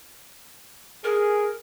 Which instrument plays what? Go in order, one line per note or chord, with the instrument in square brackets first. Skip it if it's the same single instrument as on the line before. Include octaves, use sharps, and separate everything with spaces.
[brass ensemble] G#4 [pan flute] A#4